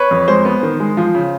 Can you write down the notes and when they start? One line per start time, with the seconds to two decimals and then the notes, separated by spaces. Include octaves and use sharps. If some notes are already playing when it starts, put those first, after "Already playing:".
Already playing: B4 C#5
0.11 F2
0.28 G#3 C5
0.45 B3
0.63 D#3
0.80 G#3
0.97 F3
1.15 C#3